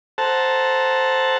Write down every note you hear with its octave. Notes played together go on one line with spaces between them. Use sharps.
A4 C5 F#5 A5 A#5